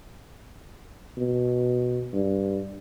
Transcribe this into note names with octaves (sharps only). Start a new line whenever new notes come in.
B2
G2